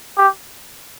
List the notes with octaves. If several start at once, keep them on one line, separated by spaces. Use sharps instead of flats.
G4